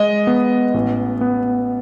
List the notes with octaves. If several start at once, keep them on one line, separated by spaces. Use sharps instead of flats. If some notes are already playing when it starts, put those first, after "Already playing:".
Already playing: G#3 D#5
B3
A1
B3